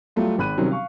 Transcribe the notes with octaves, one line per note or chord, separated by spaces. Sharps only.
F#3 G3 A3 F4
G#1 B5 F#6 D#7
C3 D#3 F#3 G3 C4 C#4
F5 C#6